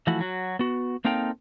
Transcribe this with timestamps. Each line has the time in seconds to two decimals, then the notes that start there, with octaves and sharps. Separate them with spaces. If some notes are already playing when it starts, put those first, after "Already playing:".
0.07 E3 F3 A3 E4 F#4
0.20 F#3 F#4
0.59 B3 F#4
1.05 A#3 C4 D#4 A4 F5 G5